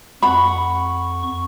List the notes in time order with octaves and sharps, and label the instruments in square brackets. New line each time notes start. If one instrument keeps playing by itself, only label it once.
[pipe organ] F2 C#6 [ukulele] F#5 B5